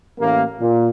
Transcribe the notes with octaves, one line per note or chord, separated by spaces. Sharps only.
A1 A#3
A#2